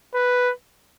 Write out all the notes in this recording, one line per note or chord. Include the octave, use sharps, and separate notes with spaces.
B4